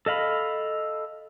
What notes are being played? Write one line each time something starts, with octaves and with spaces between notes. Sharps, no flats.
A4 D#5 F5 B5